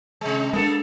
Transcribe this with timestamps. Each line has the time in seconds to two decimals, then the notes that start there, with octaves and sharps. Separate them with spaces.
0.21 C3 G#3
0.53 G#3 A#3 D4 A4